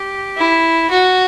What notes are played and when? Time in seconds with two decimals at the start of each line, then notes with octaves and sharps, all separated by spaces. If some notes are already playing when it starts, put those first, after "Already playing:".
Already playing: G4
0.37 E4
0.90 F#4